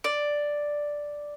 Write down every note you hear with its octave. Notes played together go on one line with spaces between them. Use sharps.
D5